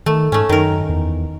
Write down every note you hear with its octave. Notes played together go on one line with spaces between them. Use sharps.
D#3 A3
G#2 A3 C#4
F#2 D#3 A#4
E2